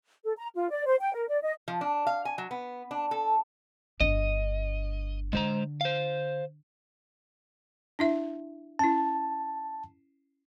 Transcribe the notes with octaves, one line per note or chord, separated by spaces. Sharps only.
A4
A#5
F4
D5
C5
G5
A#4
D5
D#5
F3
D4
F5
G#5
F#3
B3
D4
A4
G1 D4 D#5
D3 G#3 C5 A#5
C5 F5
D4 E4 E5
C#4 E4 A5